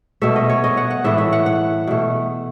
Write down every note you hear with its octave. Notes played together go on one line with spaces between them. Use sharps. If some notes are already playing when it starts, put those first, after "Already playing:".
B2 A3 E5
D#5
C#5
D#5
F#5
F#5
A2 E3 A3 E5
E5
F#5
F#5
B2 A3